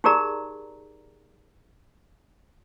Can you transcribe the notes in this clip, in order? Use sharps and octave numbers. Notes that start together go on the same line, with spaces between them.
D#4 G4 G#4 A#4 D5 A#5